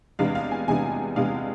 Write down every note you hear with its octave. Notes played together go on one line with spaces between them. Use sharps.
E2 C3 G#3 B3 D4 F5
F5
G#5
E2 C3 G#3 B3 D4 G#5
E2 C3 G#3 B3 D4 F5